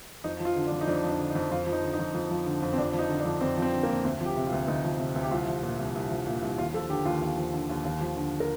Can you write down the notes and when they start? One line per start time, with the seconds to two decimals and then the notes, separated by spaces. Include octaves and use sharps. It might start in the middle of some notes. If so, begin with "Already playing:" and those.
0.24 F2 D#4
0.40 F3
0.45 F4
0.56 D3
0.67 D4
0.72 F2
0.81 D#4
0.87 F2 D4
1.04 F3
1.09 D4
1.20 D3
1.30 D#4
1.35 F2
1.51 F2 F4
1.67 F3
1.72 D#4
1.83 D3
1.93 D#4
1.99 F2
2.14 F2
2.31 F3
2.46 D3
2.62 F2
2.73 C4
2.78 F2 D4
2.94 F3
2.99 D#4
3.10 D3
3.20 D4
3.25 F2
3.41 F2 C4
3.57 F3
3.62 C4
3.73 D3
3.83 A#3
3.89 F2
4.04 D2 C4
4.21 F3
4.26 G4
4.36 C3
4.47 F4
4.52 D2
4.68 D2 D#4
4.84 F3
5.00 C3
5.16 D2
5.23 G4
5.31 C2 F4
5.47 F3
5.63 A#2
5.79 C2
5.95 C2
6.10 F3
6.26 A#2
6.42 C2
6.58 D#2 F4
6.74 F3 A4
6.90 D3 G4
7.05 D#2 F4
7.22 D#2
7.37 F3
7.54 D3
7.69 D#2
7.85 D#2
8.01 F3
8.17 D3
8.40 A#4